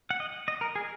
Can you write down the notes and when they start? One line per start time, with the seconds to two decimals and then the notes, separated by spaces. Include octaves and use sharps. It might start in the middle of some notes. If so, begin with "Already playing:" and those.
0.10 F#5
0.20 D#5
0.48 D#5
0.61 A#4
0.75 G#4